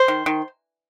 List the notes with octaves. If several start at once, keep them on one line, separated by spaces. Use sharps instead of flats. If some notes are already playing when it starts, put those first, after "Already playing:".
Already playing: C5
D#3
D#3